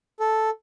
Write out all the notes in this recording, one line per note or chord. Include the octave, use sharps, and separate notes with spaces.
A4